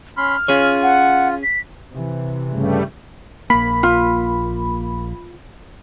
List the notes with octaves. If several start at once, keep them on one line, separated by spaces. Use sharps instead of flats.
C#4 B5 C6 F6
C#4 F4 G#4 C#5
F#5
B6
C3 E3
G2 C#3 G3 A3
A#1 A#3 B5
F4